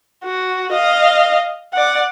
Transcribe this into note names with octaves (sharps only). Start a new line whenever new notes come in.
F#4
D#5 F5
D5 F#5